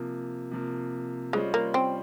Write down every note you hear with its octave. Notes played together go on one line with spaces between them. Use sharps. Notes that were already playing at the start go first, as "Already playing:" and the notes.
Already playing: C3 F3 A#3
C3 F3 A#3
G3 G#3 C#4 F4 C5 D#5
A#3
C4